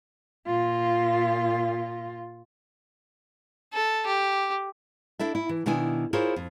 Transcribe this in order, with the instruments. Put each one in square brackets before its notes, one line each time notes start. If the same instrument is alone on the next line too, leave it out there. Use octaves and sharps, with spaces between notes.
[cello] A#2 F4
[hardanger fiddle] A4
G4
[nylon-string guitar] D4 E4 A4 E5
E4
E3
B2 D#3 D4 E4 G#5
E4 F4 G#4 A#4 C5 C#5
F2